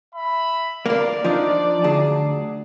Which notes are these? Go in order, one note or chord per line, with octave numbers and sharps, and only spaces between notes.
E5 B5
D3 F3 A#3 A#4 D5 F5
F3 A#3 D4 D#4
D2 F#3 G#4 A5